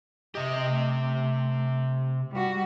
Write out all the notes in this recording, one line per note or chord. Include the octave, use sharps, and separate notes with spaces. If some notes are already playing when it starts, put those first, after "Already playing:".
C3 G4 D#5
A3
G3 F#4